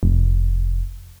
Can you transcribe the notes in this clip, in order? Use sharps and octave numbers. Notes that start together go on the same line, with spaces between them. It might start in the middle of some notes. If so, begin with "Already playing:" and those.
F1